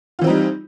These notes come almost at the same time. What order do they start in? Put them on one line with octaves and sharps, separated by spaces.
F4 E3 C4 D#4 G3